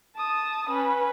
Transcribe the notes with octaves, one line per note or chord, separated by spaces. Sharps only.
A5 D#6
C#4 B4